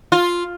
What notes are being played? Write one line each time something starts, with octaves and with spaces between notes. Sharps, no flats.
F4